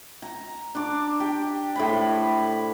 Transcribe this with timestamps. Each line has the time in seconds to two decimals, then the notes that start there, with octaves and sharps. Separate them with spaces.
0.22 A#5
0.75 D4 D6
1.20 G4
1.76 A2 C5 B5